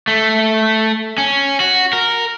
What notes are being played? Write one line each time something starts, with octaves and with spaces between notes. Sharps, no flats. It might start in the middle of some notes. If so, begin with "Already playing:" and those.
A3
C#4
F#4
A#4